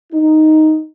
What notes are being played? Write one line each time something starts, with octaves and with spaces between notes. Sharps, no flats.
D#4